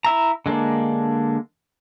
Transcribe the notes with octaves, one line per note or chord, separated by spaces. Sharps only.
E4 E5 A#5
D3 G#3 A#3 D4